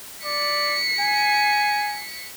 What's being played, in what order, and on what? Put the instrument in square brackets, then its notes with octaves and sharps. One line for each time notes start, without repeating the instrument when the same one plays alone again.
[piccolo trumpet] D5 [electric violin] B6 C#7
[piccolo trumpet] G#5